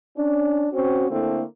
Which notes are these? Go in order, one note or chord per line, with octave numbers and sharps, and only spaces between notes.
C#4 D4
C4 C#4 F#4
D3 A3 A#3 C4 E4